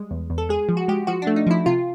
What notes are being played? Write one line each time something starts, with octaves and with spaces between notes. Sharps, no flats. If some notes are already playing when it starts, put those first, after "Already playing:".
Already playing: G3 G#3
E2
E2
A4
G#3 G#4
F3
F#4
G#3 G4
F3 F#4
A3 D4
D#4
F3 E4
C3 F4